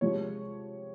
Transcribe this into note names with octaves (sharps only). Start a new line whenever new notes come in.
C3 F3 G#3 C#5